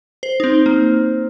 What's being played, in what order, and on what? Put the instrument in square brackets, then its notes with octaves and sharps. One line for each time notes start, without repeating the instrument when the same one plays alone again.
[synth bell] C5
D#4
C4
A#3